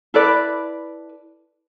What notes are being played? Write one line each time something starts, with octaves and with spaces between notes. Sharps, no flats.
E4 A4 B4 D5